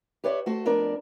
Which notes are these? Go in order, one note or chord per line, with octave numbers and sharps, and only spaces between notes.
G4 B4 C#5 D5 E5
A3 F#4 C5
F2 B3 D4 A#4 D5